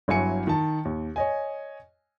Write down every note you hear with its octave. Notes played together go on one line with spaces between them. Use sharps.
G1 F#3 E4 G#5 C#7
D#3 A5
D#2
C#5 D#5 G#5